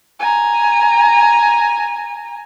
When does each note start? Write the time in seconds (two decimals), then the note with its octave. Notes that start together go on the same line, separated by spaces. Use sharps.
0.20 G#5 A#5